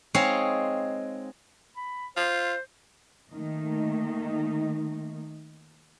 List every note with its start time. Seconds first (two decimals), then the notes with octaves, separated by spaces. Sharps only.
0.14 G#3 C4 D#4 G#4 C#5 F5
1.76 B5
2.17 F4 C5
3.29 D#3 A3 A#3 D#4